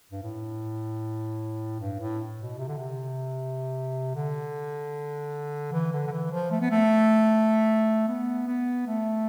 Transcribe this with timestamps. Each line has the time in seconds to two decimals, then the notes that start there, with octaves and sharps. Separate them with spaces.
0.12 G2
0.23 A2
1.80 G2
2.00 A2
2.39 B2
2.58 C3
2.68 D3
2.78 C3
4.15 D3
5.73 E3
5.92 D3
6.07 D3
6.11 E3
6.31 F3
6.51 A3
6.61 B3
6.70 A3
8.08 B3
8.47 B3
8.86 A3